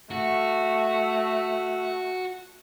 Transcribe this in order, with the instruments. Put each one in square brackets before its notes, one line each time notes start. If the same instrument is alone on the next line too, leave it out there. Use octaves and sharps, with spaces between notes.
[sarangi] A3 [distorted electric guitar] F#4